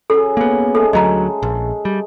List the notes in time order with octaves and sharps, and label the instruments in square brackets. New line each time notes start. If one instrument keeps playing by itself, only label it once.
[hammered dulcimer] C#3 F#3 [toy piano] A4
[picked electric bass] A#3 B3
[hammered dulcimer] G#3 A3 [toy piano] A4
[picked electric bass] D2 F#3 [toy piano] D#5 A#5
[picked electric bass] A#1
G3